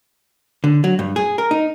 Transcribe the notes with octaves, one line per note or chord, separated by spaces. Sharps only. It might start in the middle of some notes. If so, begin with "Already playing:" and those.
D3
F#3
G2
G#4
A#4
D#4